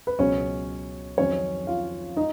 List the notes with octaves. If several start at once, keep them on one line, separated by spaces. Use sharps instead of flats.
B4
C#2 B2 F#3 C#4 C#5
F2 D#3 F#3 C#4 C#5
F4 F5
D#4 D#5